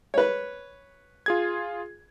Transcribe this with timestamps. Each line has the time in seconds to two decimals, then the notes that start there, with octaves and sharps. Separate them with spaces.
0.14 B4 C#5
1.26 F4 G#4 G#6